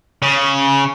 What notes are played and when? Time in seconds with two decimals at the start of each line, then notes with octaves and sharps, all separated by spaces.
0.22 C#3